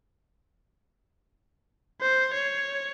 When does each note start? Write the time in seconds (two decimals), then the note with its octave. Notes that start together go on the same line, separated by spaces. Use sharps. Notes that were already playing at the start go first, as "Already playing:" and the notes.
2.01 C5
2.34 C#5